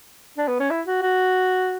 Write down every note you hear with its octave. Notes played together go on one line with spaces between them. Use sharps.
D4
B3
C#4
E4
F#4
F#4